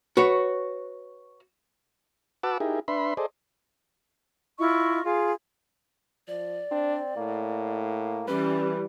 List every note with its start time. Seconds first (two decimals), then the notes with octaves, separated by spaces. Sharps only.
0.17 F#4 B4 C#5
2.43 F#4 B4 F#5 A5 D6 E6
2.60 D#4 E4 G4 G#4 A#4
2.88 D4 B4 E5 B5 C6
3.17 G#4 A4 C5 D5 D#5
4.59 E4 F4 D#5 C#6
5.03 F4 G#4
6.28 F3 D5
6.71 C4 D4
7.17 A2 A#3
8.28 E3 G3 C#4 B4